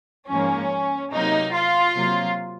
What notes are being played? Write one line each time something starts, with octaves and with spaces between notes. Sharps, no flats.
G#2 F3 A#3 C#4
C3 F#3 A#3 D#4
F4
C3 F#3 A#3